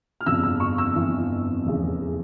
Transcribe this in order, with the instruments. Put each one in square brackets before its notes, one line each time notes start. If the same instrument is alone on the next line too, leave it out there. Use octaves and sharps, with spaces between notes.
[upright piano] F6
G1 F2 C#3 E6
E6
C#6
E6
G1 F2 E3
F1 E2 C#3